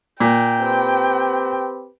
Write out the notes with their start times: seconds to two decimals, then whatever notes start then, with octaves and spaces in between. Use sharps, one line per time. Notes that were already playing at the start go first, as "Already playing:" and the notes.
0.20 A#2 G5
0.59 C4 G4 B4